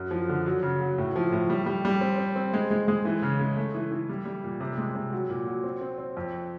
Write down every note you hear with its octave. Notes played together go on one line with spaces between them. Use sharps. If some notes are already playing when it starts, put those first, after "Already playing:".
Already playing: F#2
F3
D3
F#3
C#3
F#3
A2
F3
A2
G3
G3
G3
C4
C4
C4
G#3
G#3
G#3
E3
C#3
G#3
A3
E3
E3
G3
G3
A#2
C3
G#3
C3
F#3
A#2
F#3
C4
C4
C4
F2